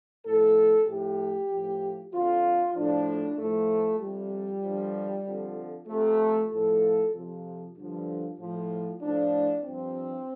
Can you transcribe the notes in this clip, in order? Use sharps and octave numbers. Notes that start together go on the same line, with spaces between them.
A2 F3 A4
A2 F3 G4
A2 F3
F2 D3 F3 F4
A2 F3 D4
A2 F3 A3
F2 C3 F3 G3
G2 D3 F3
F2 D3 F3
F2 C3 F3 A3
A2 F3 A4
F2 C3 F3
G2 D3 F3
A2 F3
A2 F3 D4
G2 F3 C4